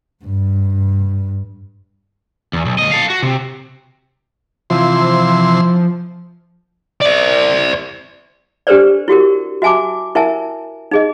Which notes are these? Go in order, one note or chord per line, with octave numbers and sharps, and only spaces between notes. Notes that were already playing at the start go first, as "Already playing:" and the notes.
G2
E2
B1
D2 D#5
A4 F5
F#4
C3
C3 E3 F3 C6
C5 D5
D4 G4 A4 B4 C5 D5
E4 F#4 G4 A#4
F#4 E5 G#5 A5 D6
E4 A#4 E5 G#5 A5
D#4 G#4 D#5